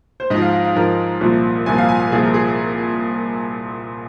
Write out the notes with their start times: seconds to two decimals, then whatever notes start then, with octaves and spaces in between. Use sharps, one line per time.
0.20 C5
0.30 G#2 F3 D#5
0.42 F5
0.53 F5
0.65 F5
0.75 G#2 F3 A#4
1.21 C2 A#2 F3
1.66 C2 A#2 F3 G#5
1.78 F5
1.89 G#5
2.00 G#5
2.12 C2 A#2 F3 G#4
2.23 A#4
2.34 G#4